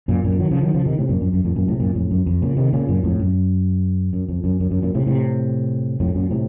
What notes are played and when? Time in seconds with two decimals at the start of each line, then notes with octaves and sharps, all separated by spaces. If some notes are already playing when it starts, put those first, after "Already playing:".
0.08 F#2 A#2
0.24 F#2 A#2
0.40 D#3 F#3
0.51 C#3 F3
0.63 D#3 F#3
0.74 C#3 F3
0.86 C3 D#3
0.98 A2 C3
1.09 F#2 A#2
1.21 F#2
1.33 F#2
1.45 F2 A2
1.56 F#2 A#2
1.68 A2 C3
1.80 F#2 A#2
1.95 F2 A2
2.11 F#2
2.26 F2
2.42 A#2 C#3
2.57 C3 D#3
2.73 A#2 C#3
2.88 F#2 A#2
3.04 F2 A2
3.19 F#2
4.13 F#2
4.29 F2
4.44 F#2
4.60 F#2
4.71 F#2
4.82 F#2 A#2
4.95 A2 C3
5.06 A2 C3
6.00 F2 A2
6.15 F#2 A#2
6.30 A2 C3